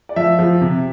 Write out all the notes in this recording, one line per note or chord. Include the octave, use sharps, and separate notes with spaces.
D5
F3 E5
F3
C3